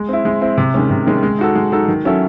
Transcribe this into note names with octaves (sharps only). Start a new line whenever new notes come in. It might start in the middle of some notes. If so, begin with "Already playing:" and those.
Already playing: G#3
C4 E4
G#3
C4 E4
C3
D#3 G#3 C#4
C3
D#3 G#3 C#4
G#3
D#4 F#4 A4
G#3
D#4 F#4 A4
D#3
F#3 C#4 E4 A4